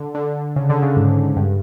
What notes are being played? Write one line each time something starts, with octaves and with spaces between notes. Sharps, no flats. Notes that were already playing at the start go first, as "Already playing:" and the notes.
Already playing: D3
D3
C#3
D3
C#3
G#2
G2